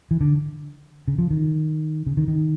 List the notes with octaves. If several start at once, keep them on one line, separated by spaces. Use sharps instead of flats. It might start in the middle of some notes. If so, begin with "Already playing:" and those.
E3
D3
C#3
F3
D#3
C#3
D#3
D#3